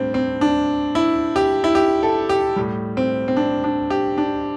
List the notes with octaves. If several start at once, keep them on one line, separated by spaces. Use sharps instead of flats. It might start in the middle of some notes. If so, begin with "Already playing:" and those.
Already playing: A2 G3 C4 D4
C4
D4
E4
G4
E4
G4
A4
G4
A2 G3
C4
C4
D4
D4
G4
D4